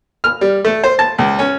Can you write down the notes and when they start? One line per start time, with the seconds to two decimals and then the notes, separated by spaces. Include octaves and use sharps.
0.24 F6
0.41 G3
0.64 A3
0.84 C5
0.99 A5
1.18 C#2
1.39 C#4